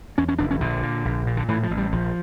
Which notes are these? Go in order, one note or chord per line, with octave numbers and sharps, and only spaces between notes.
E2 C#4
C#4
F1 D4
C#4
A#1 D3
A#2
A#1
A#2
D3
A2 E3
F3
A1
G3
A#1 F3